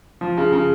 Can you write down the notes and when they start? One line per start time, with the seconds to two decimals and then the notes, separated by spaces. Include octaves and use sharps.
0.21 F3
0.38 C#3
0.53 C#3